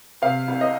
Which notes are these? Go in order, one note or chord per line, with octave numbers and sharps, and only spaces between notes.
C3 F5
C2
D#5